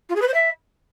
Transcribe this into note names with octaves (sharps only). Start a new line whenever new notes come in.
F4
G#4
B4
C5
E5